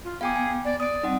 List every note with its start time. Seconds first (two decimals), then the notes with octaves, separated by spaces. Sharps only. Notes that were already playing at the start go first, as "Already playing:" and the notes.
0.04 F4
0.21 B3 G#4 F5 G5 D6
0.36 G#5
0.65 D5
0.80 D5 D#6 D7
1.03 G3 C4 D#4 F#5